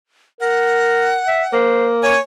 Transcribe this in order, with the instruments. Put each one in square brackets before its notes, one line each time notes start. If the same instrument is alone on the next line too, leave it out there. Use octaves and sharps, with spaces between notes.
[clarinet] A#4 [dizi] F#5
[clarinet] E5
[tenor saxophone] A#3 [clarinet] C5
[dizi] C#5 [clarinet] G#5